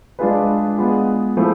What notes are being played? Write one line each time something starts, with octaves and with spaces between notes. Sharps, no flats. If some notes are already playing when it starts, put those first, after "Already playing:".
G#3 D4 F4 G#4 B4
G#3 B3 F4 G#4
F3 A3 E4 G#4 C5